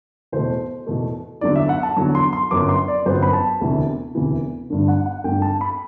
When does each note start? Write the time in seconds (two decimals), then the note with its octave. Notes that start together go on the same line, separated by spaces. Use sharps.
0.32 E2 B2 A3 C5
0.87 E2 B2 A3
1.41 E2 D3 F#3 D5
1.55 E5
1.69 F#5
1.83 A5
1.96 E2 D3 F#3
2.15 C6
2.33 C6
2.51 G1 F#2 F#3 B3 D6
2.69 C6
2.88 D5
3.06 G1 F#2 F#3 B3 C5
3.23 B5
3.33 A5
3.61 E1 D2 C3 E3
4.15 E1 D2 C3 E3
4.70 G1 G2 D3 A3
4.88 F#5
5.06 F#5
5.24 G1 G2 D3 A3 G5
5.42 A5
5.61 B5